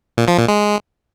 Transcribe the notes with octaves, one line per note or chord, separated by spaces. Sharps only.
A#2
F3
A#2
G#3